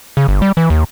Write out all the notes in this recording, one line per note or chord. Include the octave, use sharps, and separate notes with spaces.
C#3
G1
G3
E3
D#2